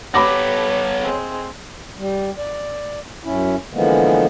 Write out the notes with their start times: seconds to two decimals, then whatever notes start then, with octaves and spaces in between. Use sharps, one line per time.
0.14 B3 G4 A4 B4 C#5 B5 D6 A#6
1.02 G#3 C4
1.98 G3
2.38 D5
3.24 F#2 C#4 E4
3.74 D3 E3 F3 G#3 A#3 B3